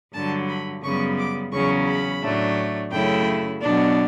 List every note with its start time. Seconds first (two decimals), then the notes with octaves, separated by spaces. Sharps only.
0.14 G2 D3 F#3 A5
0.48 B5
0.83 F#2 C#3 G3 B3 C#6
1.18 D6
1.52 E2 C#3 F#3 C#4 C#6
1.88 B5
2.22 A2 F#3 A3 D4
2.91 F#2 C#3 F#3 A3 E4 G5
3.61 B2 F#3 B3 D4